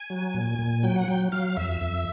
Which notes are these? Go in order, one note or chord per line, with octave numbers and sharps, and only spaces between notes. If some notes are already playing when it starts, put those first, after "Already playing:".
Already playing: G#5
F#3
A#2
A#2
F#3 G5
F#5
F#3 G5
F#3 F5
F2 E5
F2